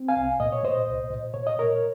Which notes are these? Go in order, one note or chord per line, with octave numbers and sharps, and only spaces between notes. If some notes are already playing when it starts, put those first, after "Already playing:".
Already playing: C4
F5 G#5
C2
A#2 D#5
C#5
A#2 C5 D#5
C2
A#2
A#2 C#5
D#5
A#2 A#4 C#5